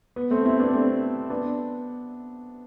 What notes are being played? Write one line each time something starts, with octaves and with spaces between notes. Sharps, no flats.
B3
A3 C4
C4 E4
B3 D4
A3 C4
B3 D4